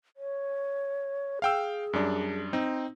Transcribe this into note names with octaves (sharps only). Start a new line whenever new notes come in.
C#5
G#4 F5 G5 E6
F#2 G3 D4
C4 D#4